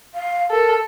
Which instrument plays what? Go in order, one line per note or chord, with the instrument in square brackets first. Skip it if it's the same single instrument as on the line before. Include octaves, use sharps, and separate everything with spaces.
[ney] F5
[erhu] A4 [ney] A#4